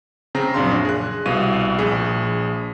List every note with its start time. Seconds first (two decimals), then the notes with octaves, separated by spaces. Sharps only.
0.35 C#3 C4 A#5 A#6
0.54 A#1 F#2 D4 F5 C6
0.85 G#4 F#6
1.26 C2 B2 F5 D#7
1.78 A#1 G#4